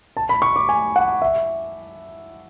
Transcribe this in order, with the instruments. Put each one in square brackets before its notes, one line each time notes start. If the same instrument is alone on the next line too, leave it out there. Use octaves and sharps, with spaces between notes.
[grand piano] A5
B5
C#6
D6
G#5
F#5
E5